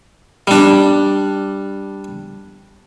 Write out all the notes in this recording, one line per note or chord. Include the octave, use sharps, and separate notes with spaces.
G3 D4